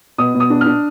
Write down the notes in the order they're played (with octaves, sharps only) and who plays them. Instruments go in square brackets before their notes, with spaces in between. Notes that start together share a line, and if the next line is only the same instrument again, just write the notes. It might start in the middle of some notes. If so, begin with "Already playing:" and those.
[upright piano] B2 D#6
B2
D#6
D4
D4 F6